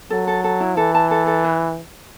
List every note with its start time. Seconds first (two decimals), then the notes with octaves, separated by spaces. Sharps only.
0.10 F#3 A4
0.27 A4
0.44 A4
0.60 E4
0.77 E3 A4
0.95 A5
1.11 A4
1.27 A4
1.44 B4